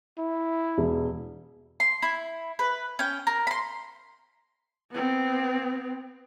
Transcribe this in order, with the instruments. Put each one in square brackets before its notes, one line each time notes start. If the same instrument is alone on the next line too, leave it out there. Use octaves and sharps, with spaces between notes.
[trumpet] E4
[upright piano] E1
[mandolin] C6
E4
B4
C#4 G5
A#4
B5 C6
[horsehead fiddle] B3 C4